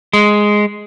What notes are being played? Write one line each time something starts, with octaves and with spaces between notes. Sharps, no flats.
G#3